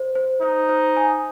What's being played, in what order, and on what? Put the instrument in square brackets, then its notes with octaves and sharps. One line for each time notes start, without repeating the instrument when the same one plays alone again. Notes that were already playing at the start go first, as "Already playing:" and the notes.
Already playing: [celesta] C5
C5
[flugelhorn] D#4 [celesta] C5
[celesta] C5
G#5